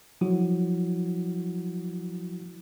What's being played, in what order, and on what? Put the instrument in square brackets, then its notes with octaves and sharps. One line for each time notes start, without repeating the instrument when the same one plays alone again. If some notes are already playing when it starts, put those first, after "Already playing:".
[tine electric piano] F3 F#3 E4 F#4